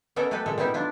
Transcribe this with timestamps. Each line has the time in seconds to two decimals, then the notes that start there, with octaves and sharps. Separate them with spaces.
0.16 B3 C#4 A4 A#4 D#5 E5
0.31 A3 G4 A4 B4
0.46 A#2 G#3 A4 E5
0.58 G3 B3 D#4 E4 G4 E5
0.74 D4 E4 F4